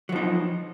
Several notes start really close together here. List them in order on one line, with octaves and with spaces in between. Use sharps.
F#3 F3 D#4